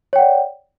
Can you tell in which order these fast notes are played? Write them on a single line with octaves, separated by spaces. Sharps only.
C#5 G5 F#5 D5